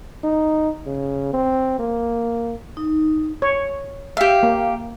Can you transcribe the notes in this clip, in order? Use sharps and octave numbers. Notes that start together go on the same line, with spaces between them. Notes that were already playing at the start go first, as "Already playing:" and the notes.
D#4
C#3
C4
A#3
D#4
C#5
G4 E5 F5 G5
A#3